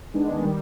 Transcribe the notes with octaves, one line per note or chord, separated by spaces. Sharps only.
D#3 G#3 B3 D4
D#3 G3